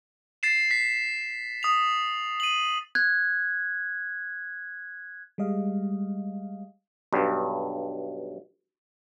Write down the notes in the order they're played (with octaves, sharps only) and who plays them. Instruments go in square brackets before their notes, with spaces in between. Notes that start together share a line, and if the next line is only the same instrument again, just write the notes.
[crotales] A6 C7 E7
B6
D#6 F7
D#7 F#7
[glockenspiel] F#6 G#6
[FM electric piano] G3 G#3 D#5 F5
[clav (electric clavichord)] B1 G2